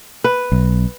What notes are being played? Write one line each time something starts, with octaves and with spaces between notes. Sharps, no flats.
B4
B1